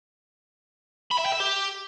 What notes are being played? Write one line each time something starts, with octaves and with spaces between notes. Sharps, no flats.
B5
E5
G5
E5
G4